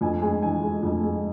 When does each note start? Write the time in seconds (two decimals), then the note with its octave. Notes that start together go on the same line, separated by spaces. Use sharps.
0.01 F2 G#5
0.22 G#3 G#5
0.42 E3 G#5
0.62 G#3
0.83 F2
1.02 G#3